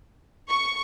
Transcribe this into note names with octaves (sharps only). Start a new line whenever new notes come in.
C#6